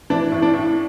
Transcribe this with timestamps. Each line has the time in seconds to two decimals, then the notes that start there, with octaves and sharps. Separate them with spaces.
0.10 E3 D4
0.32 A2
0.42 D4
0.54 A2